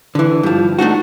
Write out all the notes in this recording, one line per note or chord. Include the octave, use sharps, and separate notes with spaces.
D3 E3
G2 F3
A3 D4 D#4 F#4